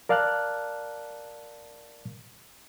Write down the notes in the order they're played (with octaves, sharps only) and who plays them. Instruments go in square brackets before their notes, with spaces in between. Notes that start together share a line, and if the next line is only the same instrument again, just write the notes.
[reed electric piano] A#4 D5 F5 A5 F6 F#6